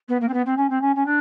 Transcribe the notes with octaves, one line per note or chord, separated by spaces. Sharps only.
B3
A#3
C4
B3
C4
C#4
C4
C#4
C#4
D4